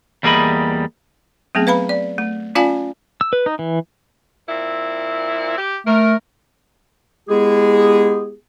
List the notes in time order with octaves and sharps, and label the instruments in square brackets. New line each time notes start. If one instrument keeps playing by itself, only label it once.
[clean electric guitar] E2 G3 A#3 G#4 D#5 B5
[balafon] F#3 A3 B3 C4 G#4
B4 F5 A#5 B5
D5
A3
C#4 F4 D5 F5 G#5 A5
[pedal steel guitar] E6
B4
D#4
E3
[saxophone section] A#2 C4 E4
G4
[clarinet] A3 [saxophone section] A#4
[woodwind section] G#3 B3 E4 G4 G#4